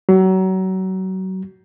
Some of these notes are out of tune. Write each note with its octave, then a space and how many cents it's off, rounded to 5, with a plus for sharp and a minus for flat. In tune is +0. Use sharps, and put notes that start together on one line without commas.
F#3 +30